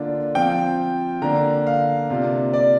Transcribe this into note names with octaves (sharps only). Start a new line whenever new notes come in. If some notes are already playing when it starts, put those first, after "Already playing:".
Already playing: D3 A#3 D4 F4
F3 C4 F4 G5
D3 A#3 D4 A#5
F5
C3 A#3 D4 F4
D5